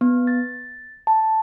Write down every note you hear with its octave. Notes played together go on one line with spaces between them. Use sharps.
B3
A6
A5